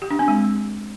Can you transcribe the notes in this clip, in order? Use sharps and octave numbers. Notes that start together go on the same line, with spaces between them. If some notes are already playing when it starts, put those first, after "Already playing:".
G4
D4
C4
G#3